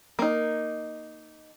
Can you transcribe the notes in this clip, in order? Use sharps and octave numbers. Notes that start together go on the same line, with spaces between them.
A#3 D#4